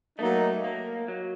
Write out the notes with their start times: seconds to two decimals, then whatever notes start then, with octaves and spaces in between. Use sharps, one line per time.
0.19 F#3 A3 A#3 D#4
0.64 A#3
1.08 F#3